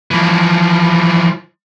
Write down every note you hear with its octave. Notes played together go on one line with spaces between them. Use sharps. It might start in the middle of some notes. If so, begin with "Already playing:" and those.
E3 F3